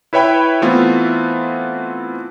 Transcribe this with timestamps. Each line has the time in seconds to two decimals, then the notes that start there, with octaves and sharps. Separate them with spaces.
0.13 E4 B4 C#5 E5 G5 B5
0.62 E3 A3 B3 C4 F4